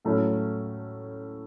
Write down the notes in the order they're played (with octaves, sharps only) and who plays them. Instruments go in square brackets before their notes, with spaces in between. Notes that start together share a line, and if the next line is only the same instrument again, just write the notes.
[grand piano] A2 F#3 A3 C#4 E4